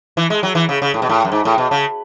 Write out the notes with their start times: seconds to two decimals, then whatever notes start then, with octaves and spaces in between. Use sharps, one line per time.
0.17 E3
0.30 G#3
0.43 F#3
0.55 E3
0.69 C#3
0.82 C#3
0.94 A2
1.02 B2
1.09 A2
1.25 F#2
1.32 G#2
1.45 A2
1.58 B2
1.71 C#3